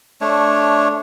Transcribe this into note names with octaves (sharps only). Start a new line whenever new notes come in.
A3 D4 C#5